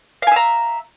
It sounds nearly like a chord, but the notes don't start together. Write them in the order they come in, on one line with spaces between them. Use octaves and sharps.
F5 G#5 E5 A#5